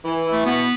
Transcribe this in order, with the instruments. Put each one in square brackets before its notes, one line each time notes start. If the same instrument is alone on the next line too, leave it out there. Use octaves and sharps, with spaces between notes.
[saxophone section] E3
E4
[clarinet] A3
[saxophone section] B2 [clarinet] B3